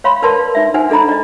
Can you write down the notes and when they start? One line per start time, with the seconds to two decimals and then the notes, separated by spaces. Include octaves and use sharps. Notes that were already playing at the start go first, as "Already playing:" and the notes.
0.04 C#5 F5 B5 C6
0.23 A#4 B4 D5 A5 C6
0.55 D#4 E5
0.74 D#4 C5 F#5 G#5
0.90 D4 A4 D#5 A#5 B5
1.09 D5 D#5